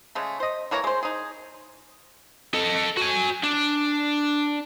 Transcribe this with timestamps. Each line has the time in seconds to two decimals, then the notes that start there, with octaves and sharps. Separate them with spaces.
0.15 C#3 G#3 A3
0.40 C5 D#5
0.71 E3 A#3 C#5 A#5
0.84 G#3 C5
1.03 D#4 G#4
2.54 A4 D#5
2.97 F#4 G#5
3.44 D4